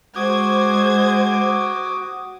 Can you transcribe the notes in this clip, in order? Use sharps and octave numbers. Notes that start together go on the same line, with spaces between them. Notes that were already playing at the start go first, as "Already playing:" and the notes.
G#3 F#4 C5 D6 D#6 G#6